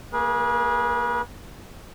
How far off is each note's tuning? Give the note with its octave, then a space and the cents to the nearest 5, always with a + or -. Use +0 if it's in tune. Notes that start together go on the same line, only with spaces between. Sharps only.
A#3 +0 G#4 +0 B4 -40